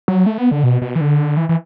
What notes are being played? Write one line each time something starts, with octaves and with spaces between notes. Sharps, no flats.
F#3
A3
B3
D3
B2
B2
E3
D3
E3
E3